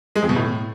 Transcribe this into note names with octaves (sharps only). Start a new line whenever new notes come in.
G#3
F2
B2
A2